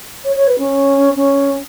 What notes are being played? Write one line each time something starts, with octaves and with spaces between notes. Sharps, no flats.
C#5
C#5
B4
C#4
C#4